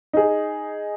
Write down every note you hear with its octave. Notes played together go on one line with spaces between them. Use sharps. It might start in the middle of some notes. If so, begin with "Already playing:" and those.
D#4 G#4